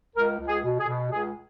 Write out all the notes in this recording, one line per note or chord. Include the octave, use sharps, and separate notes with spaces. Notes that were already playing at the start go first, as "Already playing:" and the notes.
C#2 A#4
C#2
G#4
B2
G#4
B2
C#2 G#4